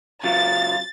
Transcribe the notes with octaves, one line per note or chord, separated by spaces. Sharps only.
C#3 F#3 F4 A6